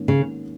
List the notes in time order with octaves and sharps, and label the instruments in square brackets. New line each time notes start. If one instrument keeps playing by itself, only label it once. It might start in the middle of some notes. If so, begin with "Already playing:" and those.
Already playing: [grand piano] G#2 D#3 A#3 C#4
[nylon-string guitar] C#3